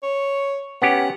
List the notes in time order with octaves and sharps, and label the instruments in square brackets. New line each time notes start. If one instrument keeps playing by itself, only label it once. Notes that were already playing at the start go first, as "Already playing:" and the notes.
[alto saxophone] C#5
[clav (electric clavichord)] B3 C#4 G4 [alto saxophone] F#5